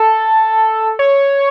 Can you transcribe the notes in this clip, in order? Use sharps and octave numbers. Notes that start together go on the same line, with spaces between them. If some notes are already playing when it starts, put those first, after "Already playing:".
Already playing: A4
C#5